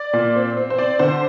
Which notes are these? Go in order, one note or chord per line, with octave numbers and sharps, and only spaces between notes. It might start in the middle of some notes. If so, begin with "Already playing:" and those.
Already playing: D5
A#2
C4
C4
C5
C4 D5
D3 C5